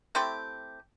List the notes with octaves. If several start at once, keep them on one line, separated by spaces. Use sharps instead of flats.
A3 C4 E4 G4